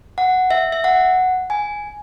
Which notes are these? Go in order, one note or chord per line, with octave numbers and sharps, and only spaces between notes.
F#5
E5
E5
F#5
G#5